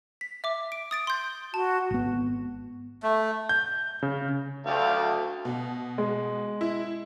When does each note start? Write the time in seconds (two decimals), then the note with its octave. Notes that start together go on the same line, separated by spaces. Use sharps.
0.21 B6
0.44 E5 D6
0.72 D7
0.91 D#6 A6 D7
1.07 C6 G6
1.54 F#4 A5
1.91 G#1 B3
3.03 A3
3.49 G6
4.02 C#3
4.66 D2 F5 G5 A5
5.45 B2
5.98 G#3
6.61 E4